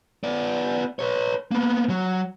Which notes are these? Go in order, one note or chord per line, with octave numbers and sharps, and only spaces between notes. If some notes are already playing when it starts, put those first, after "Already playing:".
B3 D5
B4 C#5
A#3 B3
F#3